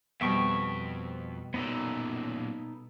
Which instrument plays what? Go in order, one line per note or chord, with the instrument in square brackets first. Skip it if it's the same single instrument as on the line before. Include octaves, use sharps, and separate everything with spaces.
[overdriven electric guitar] F2 [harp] B2 G3 [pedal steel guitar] E5 G5 C#6
[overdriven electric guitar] F#2 A#2 [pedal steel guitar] B3 D#4 A4